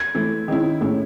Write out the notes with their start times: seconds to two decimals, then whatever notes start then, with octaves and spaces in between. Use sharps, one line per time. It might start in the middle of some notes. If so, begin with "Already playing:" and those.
Already playing: G#6
0.15 E3 A3 E4
0.48 D#3 G#3 C#4 E4
0.81 A2 G#3 C#4 E4